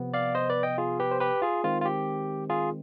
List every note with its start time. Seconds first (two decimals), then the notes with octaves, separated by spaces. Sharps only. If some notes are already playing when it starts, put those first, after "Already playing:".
Already playing: C3 F3 B3
0.14 D5 F5
0.35 C5 D#5
0.50 B4 D5
0.63 D#5 G5
0.78 F4 G#4
1.00 G4 B4
1.11 C5
1.20 G4 B4
1.42 F4 G#4
1.64 D#3 G#3 C4 F4
1.81 F4
1.85 G4
2.50 F4 G#4